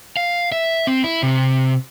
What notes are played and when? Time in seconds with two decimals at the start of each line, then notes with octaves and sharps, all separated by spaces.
0.17 F5
0.52 E5
0.87 C4
1.04 E4
1.23 C3